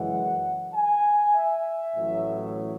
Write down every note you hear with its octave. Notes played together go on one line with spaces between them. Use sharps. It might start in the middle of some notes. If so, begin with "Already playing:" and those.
Already playing: F#2 C#3 E3 G#3 F#5
G#5
E5
A1 A2 F#3